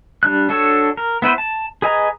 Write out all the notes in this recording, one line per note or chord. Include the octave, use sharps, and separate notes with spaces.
G3 D4 F#6
D4 F#4 A4 C#5
A#4
B3 E4 B4 C5
A5
G#4 B4 D#5 G#5 A#5